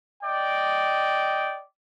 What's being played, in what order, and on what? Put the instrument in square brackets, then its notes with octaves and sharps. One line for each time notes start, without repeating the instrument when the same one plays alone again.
[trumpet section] D5 D#5 G5